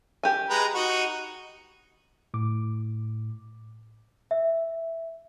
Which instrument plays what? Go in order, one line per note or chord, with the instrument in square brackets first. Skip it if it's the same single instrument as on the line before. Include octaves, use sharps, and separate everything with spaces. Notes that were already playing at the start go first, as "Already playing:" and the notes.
[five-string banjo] G4 G#5
[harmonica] G#3 B4 A#5
D#4 F#4
[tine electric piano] A2 D6
[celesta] E5